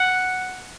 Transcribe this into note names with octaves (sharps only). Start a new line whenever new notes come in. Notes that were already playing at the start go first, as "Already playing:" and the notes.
Already playing: F#5